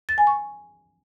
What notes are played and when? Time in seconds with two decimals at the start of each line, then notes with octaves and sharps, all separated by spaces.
0.09 A6
0.18 G#5
0.27 C#6